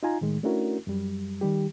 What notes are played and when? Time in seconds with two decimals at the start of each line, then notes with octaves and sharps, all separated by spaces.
0.03 D#4 F4 G#5 A#5
0.21 A2 D#3 G#3
0.43 A3 C#4 D4 E4 F#4 A#4
0.87 F#2 G3
1.41 D#3 G3 G4